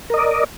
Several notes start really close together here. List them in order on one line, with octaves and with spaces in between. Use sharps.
A#4 D#5 D5